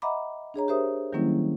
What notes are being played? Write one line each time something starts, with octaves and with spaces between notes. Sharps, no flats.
D#5 E5 F#5 A#5 B5 D6
D4 G#4 C#5 A#5
G4 A#4 C5 E5 D#6
D#3 F#3 G3 A#3 C#4 E4